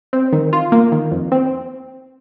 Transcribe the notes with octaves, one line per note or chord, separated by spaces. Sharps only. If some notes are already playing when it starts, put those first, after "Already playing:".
C4
D#3
F4
A#3
D#3
F2
C4